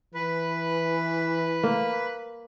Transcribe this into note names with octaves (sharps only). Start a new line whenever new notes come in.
E3 B4
A#3